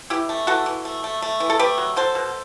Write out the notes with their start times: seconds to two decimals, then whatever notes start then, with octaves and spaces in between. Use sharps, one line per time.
0.10 E3 E4 G4
0.29 A3
0.47 E3 F#4 A4
0.66 E3
0.85 A3
1.04 A3
1.22 A3
1.40 E3
1.50 A4
1.59 A3 G4 B4
1.78 F#3
1.96 F#3 A4 C5
2.15 B2